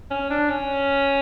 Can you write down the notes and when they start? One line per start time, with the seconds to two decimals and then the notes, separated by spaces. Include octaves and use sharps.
0.11 C#4
0.30 D4
0.50 C#4